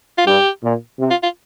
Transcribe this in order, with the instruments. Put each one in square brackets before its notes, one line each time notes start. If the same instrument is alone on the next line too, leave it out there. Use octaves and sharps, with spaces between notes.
[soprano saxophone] F4
[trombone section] G2 [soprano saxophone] G4
[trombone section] A#2
C3
[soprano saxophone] F4
F4